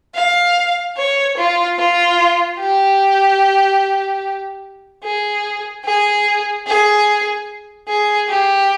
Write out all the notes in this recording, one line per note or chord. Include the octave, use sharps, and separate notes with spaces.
F5
C#5
F4
F4
G4
G#4
G#4
G#4
G#4
G4